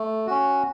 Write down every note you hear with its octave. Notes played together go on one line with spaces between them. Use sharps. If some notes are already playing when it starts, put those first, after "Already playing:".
Already playing: A3
C#4 F#4